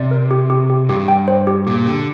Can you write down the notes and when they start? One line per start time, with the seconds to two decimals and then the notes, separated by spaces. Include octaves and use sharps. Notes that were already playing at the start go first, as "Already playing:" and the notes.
Already playing: C3 D5
0.11 A#4
0.31 G4
0.50 G4
0.70 G4
0.89 G2 G4
1.08 G5
1.28 C5
1.47 G4
1.67 A#2 G4
1.86 D3 G4